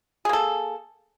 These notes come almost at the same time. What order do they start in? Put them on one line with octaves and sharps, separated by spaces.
G#4 A#3 A4